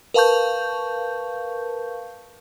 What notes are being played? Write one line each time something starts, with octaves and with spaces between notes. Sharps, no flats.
A#4 B4 F5 A5 C#6 G6